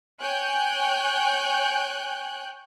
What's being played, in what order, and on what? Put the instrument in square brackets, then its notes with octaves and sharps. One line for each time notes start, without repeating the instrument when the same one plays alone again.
[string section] C#5 G5 G#5 F#6 G6